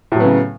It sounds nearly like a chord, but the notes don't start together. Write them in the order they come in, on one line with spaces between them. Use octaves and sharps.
A2 F#3 B3 C#3